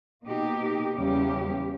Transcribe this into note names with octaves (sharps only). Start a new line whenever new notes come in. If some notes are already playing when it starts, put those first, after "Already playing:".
B2 A#3 D#4 G4
E2 C#3 G3 C#4 G4